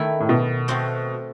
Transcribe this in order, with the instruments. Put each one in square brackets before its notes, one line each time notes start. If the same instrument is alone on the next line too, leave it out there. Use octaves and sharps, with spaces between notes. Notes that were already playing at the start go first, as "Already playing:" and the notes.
Already playing: [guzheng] D#3 A3 E4
[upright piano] A2
B2
[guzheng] A3 C4 F#4 C5